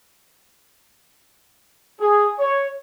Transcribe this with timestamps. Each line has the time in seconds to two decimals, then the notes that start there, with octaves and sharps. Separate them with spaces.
2.00 G#4
2.39 C#5